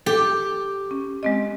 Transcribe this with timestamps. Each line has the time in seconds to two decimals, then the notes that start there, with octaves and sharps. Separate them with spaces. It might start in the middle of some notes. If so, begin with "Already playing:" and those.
0.06 G4 A4
0.91 C#4
1.23 G#3 C4 D#5